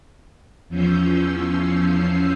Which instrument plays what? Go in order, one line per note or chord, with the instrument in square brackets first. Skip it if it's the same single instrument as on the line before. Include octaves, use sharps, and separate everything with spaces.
[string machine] E2 F3 C#4 E6 G6 C7